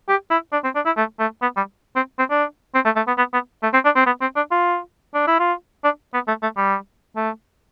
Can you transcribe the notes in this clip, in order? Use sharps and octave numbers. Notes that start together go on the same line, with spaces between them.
G4
E4
D4
C4
D4
E4
A3
A3
B3
G3
C4
C4
D4
C4
A3
A3
B3
B3
B3
A3
C4
D4
C4
B3
C4
D4
F4
D4
E4
F4
D4
B3
A3
A3
G3
A3